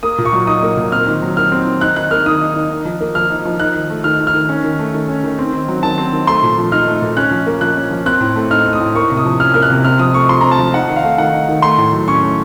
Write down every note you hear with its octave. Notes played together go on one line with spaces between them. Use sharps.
A#3 D#6
A#2
C#6
F#3
D#4 D#6
A#3
A#2
C4 F6
D#3
F#3
D#3 F6
C4
D#3
D#4 F#6
D#3 F#6
A#3 F6
D#3 D#6
D#4
D#3
D#4
F3
A#3
F3 F6
D#4
F3
D#4 F#6
D#3
A3
D#3 F6
D#4
F6
D#3
C#4
D#3
A3
D#3
C#4
D#3
C4
D#3
F#3
D#3 A5
C4
D#3
A3 C6
A#2
F3
D#4 F6
A3
A#2
C#4 F#6
F3
A#3
F3 F#6
C#4
F3
C4 F#6
A2
A3
D#4 F6
C4
D#6
A2
A#3 C#6
C3
D#6
F3
C#4 F6
A#3 F6
F#6
C3
C4 F6
F3 D#6
A3 C#6
F3 C6
C4 A#5
A5
F3
D#4 F#5
D#3
F5
A3
D#3 F#5
D#4
D#3
A3 C6
A2
F#3
C#4 C#6
A3